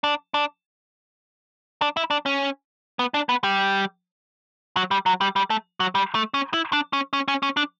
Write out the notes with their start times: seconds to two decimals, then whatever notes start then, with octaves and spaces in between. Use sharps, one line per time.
0.04 D4
0.34 D4
1.82 D4
1.97 E4
2.11 D4
2.26 C#4
2.99 B3
3.14 D4
3.29 B3
3.44 G3
4.77 F#3
4.91 G3
5.06 F#3
5.21 G3
5.36 G3
5.50 A3
5.80 F#3
5.95 G3
6.15 A3
6.34 C#4
6.54 E4
6.73 D4
6.93 C#4
7.13 C#4
7.28 C#4
7.43 C#4
7.57 D4